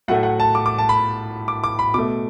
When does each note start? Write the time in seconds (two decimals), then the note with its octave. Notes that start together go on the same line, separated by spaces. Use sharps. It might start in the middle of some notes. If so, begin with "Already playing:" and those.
0.08 A2 F#3 A3 F#5
0.23 F#5
0.40 A5
0.55 D6
0.66 D6
0.78 A5
0.89 B5
1.48 D6
1.64 D6
1.79 B5
1.94 B2 A3 D6